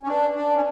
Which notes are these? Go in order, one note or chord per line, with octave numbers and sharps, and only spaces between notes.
C#4
D4 B4 D5 A5 D6
D4
C#4